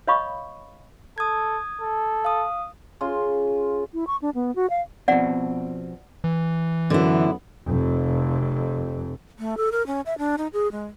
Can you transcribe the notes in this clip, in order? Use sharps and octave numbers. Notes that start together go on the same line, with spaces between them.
C#5 D#5 F5 B5 C#6 D#6
A4 D#6 G#6
A4
F5 D#6
C#3 F4 C6
E4
C#6
D4
B3
F#4
F5
B2 F3 C4 D5 F#5
E3
F#2 D3 B3 E4
F1 F2
A3
A4
A#4
C#4
E5
D4
D#4
G#4
G#3